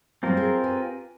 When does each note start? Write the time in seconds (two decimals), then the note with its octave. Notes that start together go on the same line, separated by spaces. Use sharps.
0.23 A2 F#3 G3 C4 F4 A#4
0.37 G#4
0.64 G4 B4 G#5